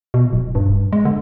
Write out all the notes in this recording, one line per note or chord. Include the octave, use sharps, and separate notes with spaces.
B2
D1
G2
G#3
D3